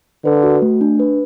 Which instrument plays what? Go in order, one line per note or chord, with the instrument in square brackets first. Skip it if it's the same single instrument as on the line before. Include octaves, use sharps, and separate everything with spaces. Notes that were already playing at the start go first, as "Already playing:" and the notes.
[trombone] D3 [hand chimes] B4
[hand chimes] F#4
A3
D4
B4